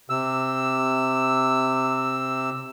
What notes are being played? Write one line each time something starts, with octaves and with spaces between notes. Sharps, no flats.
C3 E6